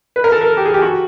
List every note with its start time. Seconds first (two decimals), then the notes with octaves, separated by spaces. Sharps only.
0.16 B4
0.24 A#4
0.32 A4
0.41 A#4
0.57 G4
0.66 G#4
0.74 G4
0.82 F#4